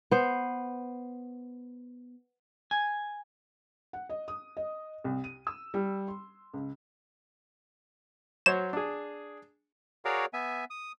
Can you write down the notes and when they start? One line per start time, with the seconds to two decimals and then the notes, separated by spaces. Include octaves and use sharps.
0.11 B3 C5
2.71 G#5
3.93 F#5
4.09 D#5
4.28 D#6
4.57 D#5
5.04 C2
5.24 D#7
5.47 E6
5.74 G3
6.08 C6
6.54 C#2
8.46 F#3 C5 C#5 E7
8.73 D4 G#4
10.05 F#4 G#4 A#4 C#5 D5 F5
10.33 B3 E5 G#5
10.70 D#6